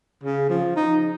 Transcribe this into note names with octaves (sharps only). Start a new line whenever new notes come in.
C#3
F3
D#4